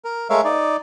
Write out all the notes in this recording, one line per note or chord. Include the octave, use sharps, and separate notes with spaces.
A#4
G#3 A3 A#4 C#5 E5 F5
D#4 D5